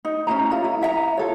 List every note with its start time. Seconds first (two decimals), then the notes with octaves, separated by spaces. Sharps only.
0.05 D#4
0.27 C#4 D4 E4 A#5
0.51 F4 A4 A#5
0.64 E4
0.81 E4 E5 F#5 A#5
1.17 F4 A4 C#5